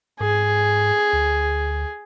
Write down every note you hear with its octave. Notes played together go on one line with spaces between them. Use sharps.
G#2 G#4
D2